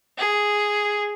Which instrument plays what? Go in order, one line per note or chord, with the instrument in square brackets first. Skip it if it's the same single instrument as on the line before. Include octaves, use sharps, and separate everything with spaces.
[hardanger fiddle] G#4